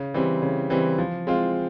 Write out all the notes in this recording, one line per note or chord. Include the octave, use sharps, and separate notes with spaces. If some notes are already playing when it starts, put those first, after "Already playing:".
Already playing: C#3
E3 G3 C4
C#3
E3 G3 C4
F3
G#3 C4 F4